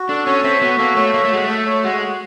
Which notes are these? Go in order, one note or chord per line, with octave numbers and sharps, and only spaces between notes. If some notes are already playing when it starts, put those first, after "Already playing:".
Already playing: F#4
D4 A4
C#4 C#5
C4 E5
B3 F#4
A#3 A4
A3 C#5
A#3 E5
A3
G#3 F#4
A3 A4
C#5
G#3 F#4
F#4